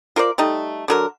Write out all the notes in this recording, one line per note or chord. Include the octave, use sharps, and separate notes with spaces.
F4 A#4 C5 D5
G3 A3 D#4
D3 F#3 A#4